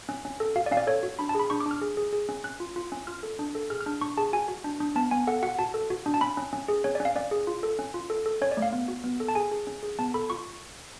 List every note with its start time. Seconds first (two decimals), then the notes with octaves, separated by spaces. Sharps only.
0.09 C#4
0.25 C#4
0.40 A4
0.56 F#4 F5
0.66 D5
0.71 C#4 F5
0.77 D5
0.87 A4 C#5
1.03 F#4
1.19 D4 B5
1.29 A5
1.35 G#4 B5
1.50 D4 C#6
1.60 D6
1.66 D4
1.71 F6
1.82 G#4
1.97 G#4
2.13 G#4
2.29 C#4
2.44 C#4 F#6
2.60 F4
2.76 F4
2.92 C#4
3.07 F4 F6
3.23 A4
3.39 D4
3.55 A4
3.70 G#4 F6
3.81 F6
3.86 D4
4.01 D4 C#6
4.17 G#4 A5
4.33 F#4 G#5
4.48 F#4
4.64 D4
4.80 D4
4.96 B3 A5
5.11 B3 G#5
5.27 A4 F#5
5.43 F#4 F#5
5.59 F#4 A5
5.74 A4
5.90 F#4
6.06 D4
6.14 A5
6.21 C#4 B5
6.37 C#4
6.53 C#4
6.68 G#4
6.84 C#4 C#5
6.95 D5
7.00 C#4
7.05 F5
7.16 C#4 D5
7.31 G#4
7.47 F4
7.63 A4
7.79 C#4
7.94 F4
8.10 A4
8.26 A4
8.41 C#4 C#5
8.52 D5
8.57 A3
8.62 F5
8.73 B3
8.88 F#4
9.04 B3
9.20 A4
9.28 A5
9.35 G#4 G#5
9.51 G#4
9.67 C#4
9.83 G#4
9.99 B3 A5
10.14 A4 B5
10.30 F4 C#6